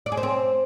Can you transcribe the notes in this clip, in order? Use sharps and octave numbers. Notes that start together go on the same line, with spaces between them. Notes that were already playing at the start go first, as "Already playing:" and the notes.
D5
G#4
C5
C4